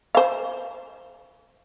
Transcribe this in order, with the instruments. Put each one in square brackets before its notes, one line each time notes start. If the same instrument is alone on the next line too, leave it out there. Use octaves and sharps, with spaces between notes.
[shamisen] C5 F5